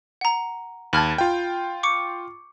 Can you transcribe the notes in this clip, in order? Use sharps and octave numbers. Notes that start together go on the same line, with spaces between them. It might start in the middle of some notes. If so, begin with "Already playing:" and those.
F#5 A#5
D#2 A5 B5 F6 G#6
F4 G5
C#6 D6 C#7